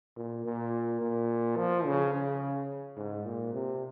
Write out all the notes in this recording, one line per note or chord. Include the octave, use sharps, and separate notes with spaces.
A#2
A#2
A#2
F3
C#3
C#3
G#2
A#2
C3